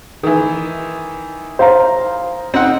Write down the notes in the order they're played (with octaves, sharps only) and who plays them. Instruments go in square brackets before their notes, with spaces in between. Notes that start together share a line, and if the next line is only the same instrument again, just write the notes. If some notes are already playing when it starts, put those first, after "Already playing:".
[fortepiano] D#3 E3
[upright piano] C5 F5 A#5
[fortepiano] C4 D#4 F#5